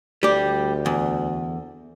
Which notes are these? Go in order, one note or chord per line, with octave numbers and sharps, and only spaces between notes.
D2 G3 G4
E2